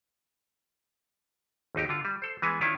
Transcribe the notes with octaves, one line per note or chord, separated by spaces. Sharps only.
G#1 D#2 D#4 G4
D3 F4
G3
A4 C5
E3 G#3 B3 G#5
D#3 C#4 D4 E4 F4